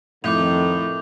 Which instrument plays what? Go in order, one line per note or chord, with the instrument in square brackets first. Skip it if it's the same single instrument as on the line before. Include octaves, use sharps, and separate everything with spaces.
[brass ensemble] F2 D#3 A3 [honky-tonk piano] A2 [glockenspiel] D6 G6 F7